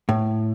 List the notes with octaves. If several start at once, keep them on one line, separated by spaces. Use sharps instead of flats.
A2